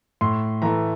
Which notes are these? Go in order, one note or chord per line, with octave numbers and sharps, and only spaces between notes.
A2 C6
E3 A3 A#5